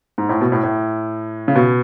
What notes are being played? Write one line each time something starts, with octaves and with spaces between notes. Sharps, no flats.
G#2
A2
B2
A2
A2
C#3
B2